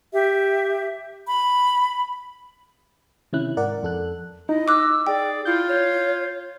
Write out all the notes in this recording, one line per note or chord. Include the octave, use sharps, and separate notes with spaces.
G4 E5
B5
C3 D#3 C#4 E4 F#6
G#2 A#4 D5 F#5
F2 A4 F#6
D#4 E4 D#5
D6 E6 F#6
G#4 D5 G5
E4 F4 G6
C#5